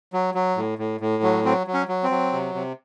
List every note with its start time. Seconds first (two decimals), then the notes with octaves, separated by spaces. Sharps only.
0.13 F#3
0.34 F#3
0.57 A2
0.78 A2
1.00 A2
1.23 F#3
1.45 F#3 C4
1.67 F#3
1.74 C#4
1.88 F#3
2.03 C4
2.11 F#3
2.33 C3
2.54 C3